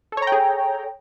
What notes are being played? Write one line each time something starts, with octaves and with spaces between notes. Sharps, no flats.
G#4 A4 C#5 G5 A#5